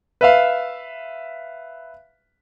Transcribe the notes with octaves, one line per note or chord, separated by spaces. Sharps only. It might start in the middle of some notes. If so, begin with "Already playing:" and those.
B4 E5 F5